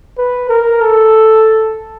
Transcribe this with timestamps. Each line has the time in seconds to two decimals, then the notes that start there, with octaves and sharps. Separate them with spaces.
0.18 B4
0.49 A#4
0.81 A4